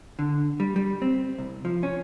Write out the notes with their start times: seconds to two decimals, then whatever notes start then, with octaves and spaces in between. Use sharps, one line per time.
0.19 D3
0.60 G3
0.76 G3
1.02 C4
1.38 C2
1.65 F3
1.83 C#4